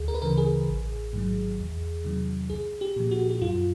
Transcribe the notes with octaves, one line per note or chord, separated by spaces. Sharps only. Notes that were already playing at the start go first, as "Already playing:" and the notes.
Already playing: D2 G#4
A#4
B4
C#3 E3 A#4
G#4
A1
G#2 D#3 F#3
E2
C3 D#3 F#3
C2 G#4
G4
A#2 F3
F#4
F#4
F#2 F4